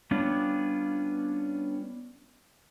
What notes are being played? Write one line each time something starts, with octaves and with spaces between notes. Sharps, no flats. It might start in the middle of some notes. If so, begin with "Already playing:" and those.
G3 B3 C#4 D4 F4